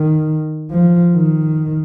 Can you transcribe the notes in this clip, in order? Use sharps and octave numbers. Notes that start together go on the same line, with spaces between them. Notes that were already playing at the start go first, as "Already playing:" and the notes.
Already playing: D#3
F3
D#3